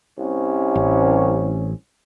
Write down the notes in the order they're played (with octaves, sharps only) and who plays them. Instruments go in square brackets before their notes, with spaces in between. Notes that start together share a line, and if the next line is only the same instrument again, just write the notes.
[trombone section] C2 C#4
[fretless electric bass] A1